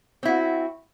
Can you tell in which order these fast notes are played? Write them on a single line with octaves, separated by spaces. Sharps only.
C4 E4 F#4